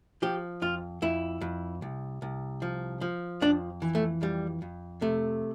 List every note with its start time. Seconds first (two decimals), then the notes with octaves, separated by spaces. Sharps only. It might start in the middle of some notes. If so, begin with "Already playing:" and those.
0.22 F3 G4
0.62 F2 F4
1.02 F2 E4
1.41 F2
1.82 C2
2.22 C2
2.62 F3
3.01 F3
3.41 F2 D4
3.82 E3
3.95 A3
4.22 F2 G3
4.62 F2
5.01 C3 A3